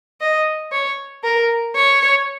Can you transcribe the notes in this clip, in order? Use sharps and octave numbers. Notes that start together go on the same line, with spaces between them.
D#5
C#5
A#4
C#5